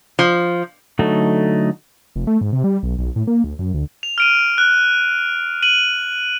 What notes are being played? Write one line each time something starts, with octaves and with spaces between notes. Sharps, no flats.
F3
D3 F#3 A3 D#4
F1
A3
G#2
C3
G3
B1
B1
A2
A#3
D2
F#2
D2
F7
F6 D7 D#7
F#6
D#7 F#7